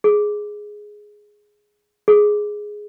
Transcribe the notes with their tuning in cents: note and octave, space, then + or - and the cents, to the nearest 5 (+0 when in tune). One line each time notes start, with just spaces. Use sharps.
G#4 +5
G#4 +5